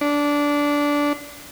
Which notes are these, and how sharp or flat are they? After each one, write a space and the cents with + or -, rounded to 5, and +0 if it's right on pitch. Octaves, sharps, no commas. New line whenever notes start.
D4 -15